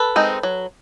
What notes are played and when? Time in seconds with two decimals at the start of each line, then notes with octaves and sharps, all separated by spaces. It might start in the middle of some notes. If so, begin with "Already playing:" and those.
Already playing: A4 B4
0.16 G#3 C4 D#4
0.43 F#3